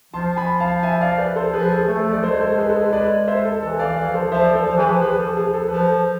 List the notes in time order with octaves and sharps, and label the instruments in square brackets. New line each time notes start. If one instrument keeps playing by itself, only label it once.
[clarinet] F3 [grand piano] A5 C6
[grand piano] G#5 B5
F5 A5
E5 G#5
D5 F5
B4 D5
A4 C5
[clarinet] F3 [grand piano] G#4 B4
[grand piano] A4
G#4
[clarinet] A3
[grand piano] A4
D5
[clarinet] F3
[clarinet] G#3 [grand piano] A4 C5
[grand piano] A4 C5
G#4 B4
A4
G#4 B4
B4 D5
C5 E5
A4
[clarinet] E3 [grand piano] A4
[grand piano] D5 F5
[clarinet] E3
[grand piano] D5 F5
[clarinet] F3
[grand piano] A4 C5
[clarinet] F3 [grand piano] C5 E5
[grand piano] D5
A4 C5
[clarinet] F3
[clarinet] E3 [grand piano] G#4 B4
[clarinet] F3
[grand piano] G#4 B4
A4
G#4
A4
[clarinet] F3 [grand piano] B4
[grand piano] A4